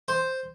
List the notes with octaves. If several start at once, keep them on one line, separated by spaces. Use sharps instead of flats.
C5